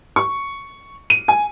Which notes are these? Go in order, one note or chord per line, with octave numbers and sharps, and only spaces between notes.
C#6
D#7
G#5